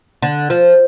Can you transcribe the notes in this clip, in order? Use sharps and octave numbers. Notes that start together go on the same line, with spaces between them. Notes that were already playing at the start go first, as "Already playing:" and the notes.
D3
F3